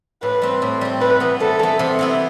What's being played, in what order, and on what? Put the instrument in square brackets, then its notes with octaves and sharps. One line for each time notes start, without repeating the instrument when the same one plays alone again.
[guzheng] A2 [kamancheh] B4
[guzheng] G3 C4
A2
G3 C4
[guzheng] C3 [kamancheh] B4
[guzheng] E3 B3
[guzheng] C3 [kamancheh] A4
[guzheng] E3 B3
C3
E3 B3 E4